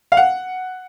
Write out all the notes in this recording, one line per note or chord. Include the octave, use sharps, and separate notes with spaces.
F5
F#5